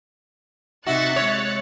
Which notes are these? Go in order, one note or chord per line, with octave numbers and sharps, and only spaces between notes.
C3 D#4 F#4 E5 F#6 A6 C#7
G#3 C#5